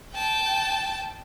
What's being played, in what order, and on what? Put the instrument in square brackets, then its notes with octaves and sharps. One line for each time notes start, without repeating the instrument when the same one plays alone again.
[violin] G5 A5